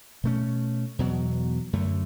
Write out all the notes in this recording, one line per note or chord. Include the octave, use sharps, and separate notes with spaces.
B2 A3 C#4
E2 B2 F#3
F#2 D3 A3